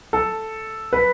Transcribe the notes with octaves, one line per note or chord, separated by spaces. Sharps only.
A4
B4